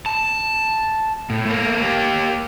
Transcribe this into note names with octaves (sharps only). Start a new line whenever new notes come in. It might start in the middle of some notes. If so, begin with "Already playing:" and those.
A5
A2
A3 A#3
A#3 G4